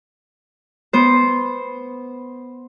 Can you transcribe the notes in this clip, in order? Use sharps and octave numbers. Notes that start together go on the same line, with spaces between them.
B3 C5